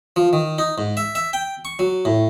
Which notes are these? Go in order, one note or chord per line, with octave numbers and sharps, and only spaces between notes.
F3
D#3
D#4
G#2
E5
E5
G5
C#6
F#3
A2